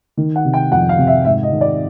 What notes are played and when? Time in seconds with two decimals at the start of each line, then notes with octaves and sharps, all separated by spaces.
0.17 D#3
0.36 F#5
0.45 C3
0.53 G5
0.72 F2 F#5
0.89 F5
0.98 C3
1.07 E5
1.25 G#2 E5
1.43 D#5
1.52 D#3
1.61 D5